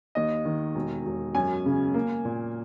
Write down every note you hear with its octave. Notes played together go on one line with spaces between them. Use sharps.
D#2 D#5
D#3
E1
E1
F#2 G#5
C#3
A#3
A#2